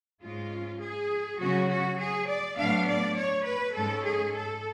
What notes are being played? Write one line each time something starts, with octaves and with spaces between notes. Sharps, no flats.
G#2 G#3 C#4 F4
G#4
C#3 F#3 C#4 F#4
F#4
G#4
D5
A2 F#3 B3 D4 F5
D5
C#5
B4
G#2 G#3 C#4 A4
G#4
A4